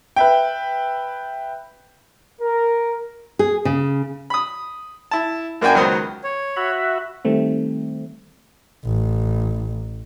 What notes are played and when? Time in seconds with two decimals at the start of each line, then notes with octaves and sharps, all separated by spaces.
0.16 B4 E5 G5
2.40 A#4
3.39 G#4
3.65 C#3
4.30 B5 D#6
5.11 E4 A5
5.61 F#2 A#3 D4 F#4 G5 G#5
5.75 C#2 D#3 F#3 B3 C5 D#6
6.24 C#5
6.56 F#4 E5 B5
7.25 D#3 G3 A3 C4
8.85 A1